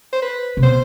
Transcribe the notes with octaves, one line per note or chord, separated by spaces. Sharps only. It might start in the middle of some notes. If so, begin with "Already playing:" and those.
C5
B4
C3
B2 C5